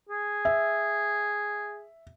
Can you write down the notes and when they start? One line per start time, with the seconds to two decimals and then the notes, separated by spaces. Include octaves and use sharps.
0.10 G#4
0.45 E5